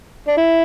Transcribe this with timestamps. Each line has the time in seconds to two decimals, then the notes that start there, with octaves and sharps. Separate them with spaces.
0.28 D4
0.37 E4